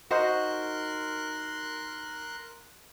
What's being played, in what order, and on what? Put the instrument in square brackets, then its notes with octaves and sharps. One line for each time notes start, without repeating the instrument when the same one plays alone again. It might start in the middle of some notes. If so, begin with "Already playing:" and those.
[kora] D#4 F#4 C5 [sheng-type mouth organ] A#4 C6 F#6